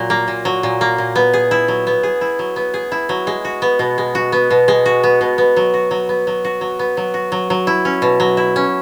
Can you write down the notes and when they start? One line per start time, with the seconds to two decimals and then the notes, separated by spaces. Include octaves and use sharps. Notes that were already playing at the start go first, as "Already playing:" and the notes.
Already playing: A#2 F#3
0.10 A#3
0.28 A#2
0.45 F#3
0.63 A#2
0.81 A#3
0.98 A#2
1.16 B3
1.33 G#4
1.51 E4
1.68 F#3
1.87 B3
2.03 G#4
2.21 E4
2.39 F#3
2.56 B3
2.74 G#4
2.92 E4
3.09 F#3
3.27 G#3
3.45 F#4
3.62 B3
3.79 B2
3.98 G#3
4.15 F#4
4.32 B3
4.51 B2
4.68 G#3
4.86 F#4
5.03 B3
5.21 B2
5.38 B3
5.57 F#3
5.74 F#4
5.91 F#3
6.09 B3
6.27 F#3
6.45 F#4
6.61 F#3
6.79 B3
6.97 F#3
7.14 F#4
7.32 F#3
7.50 F#3
7.67 E4
7.85 C#4
8.02 B2
8.20 F#3
8.37 E4
8.56 C#4